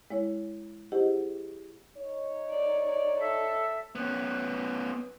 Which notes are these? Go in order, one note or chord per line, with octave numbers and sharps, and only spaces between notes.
G#3 E4 C#5
E4 G4 G#4 C5 D#5 F#5
D#4 C#5
D5
D5
A4 E5
B3 C#4